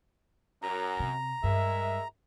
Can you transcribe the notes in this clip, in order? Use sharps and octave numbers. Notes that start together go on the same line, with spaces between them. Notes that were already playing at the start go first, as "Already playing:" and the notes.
F#2 A#5
C3
G2 G#3 A#4 E5